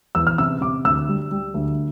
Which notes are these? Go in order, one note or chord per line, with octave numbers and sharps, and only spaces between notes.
E2 E6
F6
C3 E6
C3 D6
D2 E6
G3
G3
D2